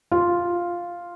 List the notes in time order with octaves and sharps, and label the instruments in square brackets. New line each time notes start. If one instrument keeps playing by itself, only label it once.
[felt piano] F4